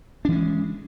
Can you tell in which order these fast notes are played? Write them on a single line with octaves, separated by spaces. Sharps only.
D4 E3 C#4 G#3